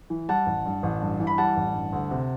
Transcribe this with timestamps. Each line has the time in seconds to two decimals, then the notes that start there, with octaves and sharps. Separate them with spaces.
0.10 E3
0.29 G3 F#5 A5
0.46 A1
0.66 G2
0.83 A1
1.01 G2
1.20 E3
1.27 B5
1.38 G3 F#5 A5
1.57 A1
1.74 G2
1.93 D2
2.11 C3